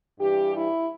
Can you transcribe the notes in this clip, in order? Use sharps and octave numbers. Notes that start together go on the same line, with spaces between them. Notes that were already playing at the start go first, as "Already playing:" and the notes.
G2 E3 G3 G4
E4